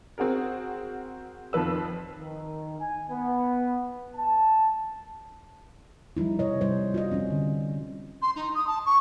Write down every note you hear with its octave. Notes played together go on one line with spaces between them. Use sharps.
C4 F#4 G#4 A#4
F2 D#3 F3 B4 E6
D#3
G#5
B3
A5
F3 G3 D#4 E4
C3 C#5 D#5
G3 C5
F4 F#4 D#5
G3 C4 C#4 D#4
D3
C6
D#4
D#6
A5
C#6